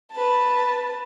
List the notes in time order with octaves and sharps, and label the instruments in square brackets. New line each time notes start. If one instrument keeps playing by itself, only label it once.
[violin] B4 A5